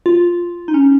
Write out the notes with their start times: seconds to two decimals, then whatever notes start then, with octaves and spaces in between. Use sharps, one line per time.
0.06 F4
0.68 D#4
0.74 C#4